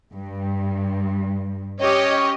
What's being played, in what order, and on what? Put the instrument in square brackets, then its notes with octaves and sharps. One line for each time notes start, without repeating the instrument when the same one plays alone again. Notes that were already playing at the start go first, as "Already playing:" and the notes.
[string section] G2
[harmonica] C#4 C#5 [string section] G4 D#5